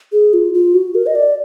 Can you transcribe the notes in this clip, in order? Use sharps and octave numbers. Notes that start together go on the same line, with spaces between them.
G#4
F4
F4
F#4
A#4
D#5
D5